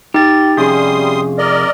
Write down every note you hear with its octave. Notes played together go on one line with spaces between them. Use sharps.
D#4 G4 A6
F2 C3 G3 C#4 G#4 C6 D#6
A#4 D5 D#5